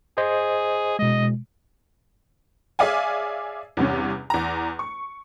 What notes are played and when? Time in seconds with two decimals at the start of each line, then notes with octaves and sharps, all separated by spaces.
0.18 G#4 C5 D#5
0.99 B2 G#3 D#5
2.79 G#4 C#5 D5 E5 F5 G#5
3.77 E2 G2 C3 C#4
4.30 E2 A#5
4.79 C#6